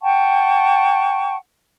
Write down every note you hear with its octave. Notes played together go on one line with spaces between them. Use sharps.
F#5 G5 A5 C#6